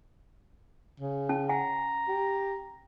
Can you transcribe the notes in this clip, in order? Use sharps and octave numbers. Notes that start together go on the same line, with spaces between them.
C#3
C#4 A5
F#5 G#5 A#5
G4